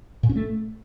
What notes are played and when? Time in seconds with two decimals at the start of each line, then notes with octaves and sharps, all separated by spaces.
0.23 A#2
0.29 C#4
0.36 A3